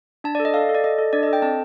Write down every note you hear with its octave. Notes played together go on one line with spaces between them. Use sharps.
D4 A5
D5
A4
D#5
A4 F5
A4
D5
A4 D#5
A4
D4 D5
D#5
A4
G5
C4 A5